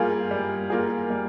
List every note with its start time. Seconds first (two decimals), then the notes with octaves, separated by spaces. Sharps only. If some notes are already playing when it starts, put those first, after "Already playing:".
Already playing: G3 A#3 F4 G#4
0.31 G3
0.70 A#3 F4 G#4
1.10 G3